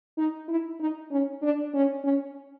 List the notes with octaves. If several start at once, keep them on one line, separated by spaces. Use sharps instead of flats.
D#4
E4
D#4
C#4
D4
C#4
C#4